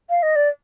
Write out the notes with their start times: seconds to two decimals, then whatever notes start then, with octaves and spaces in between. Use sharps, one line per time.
0.10 F5
0.23 D#5
0.36 D5